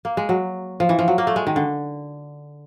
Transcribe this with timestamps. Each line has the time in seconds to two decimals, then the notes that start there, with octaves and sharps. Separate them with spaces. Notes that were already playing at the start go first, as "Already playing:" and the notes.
0.05 A#3
0.17 G#3
0.29 F#3
0.80 F3
0.89 E3
0.99 F3
1.08 F#3
1.18 A#3
1.27 A3
1.36 G#3
1.47 D#3
1.56 D3